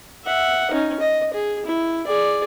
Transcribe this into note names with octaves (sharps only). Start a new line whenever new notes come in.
E5 F#5
C#4 D#4
D#5
G#4
E4
G#4 D5